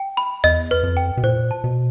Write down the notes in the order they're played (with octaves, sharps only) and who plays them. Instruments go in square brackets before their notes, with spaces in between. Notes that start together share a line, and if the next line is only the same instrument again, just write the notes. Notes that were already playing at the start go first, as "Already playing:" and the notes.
Already playing: [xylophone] G5
B5
[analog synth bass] E2 [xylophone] D#5
[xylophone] B4
[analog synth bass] F2
[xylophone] G5
[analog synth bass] B2
[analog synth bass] A#2 [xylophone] C5
[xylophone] A5
[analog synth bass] B2